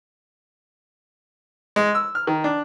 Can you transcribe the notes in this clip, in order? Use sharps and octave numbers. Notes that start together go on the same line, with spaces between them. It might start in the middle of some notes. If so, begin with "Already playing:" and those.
G#3
E6
F6
D#3
D4